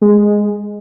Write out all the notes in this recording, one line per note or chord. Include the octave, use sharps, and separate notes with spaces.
G#3